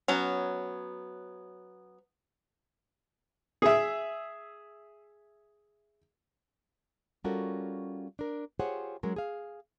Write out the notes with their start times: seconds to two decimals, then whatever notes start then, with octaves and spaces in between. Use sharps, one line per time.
0.08 F#3 B3 C#4
3.62 G#4 E5
7.24 G3 C#4 F4 F#4 A4 A#4
8.19 D4 A#4
8.59 F4 G4 G#4 C5 C#5 F#5
9.03 F#3 G#3 C#4 G#4 A#4
9.16 G#4 F5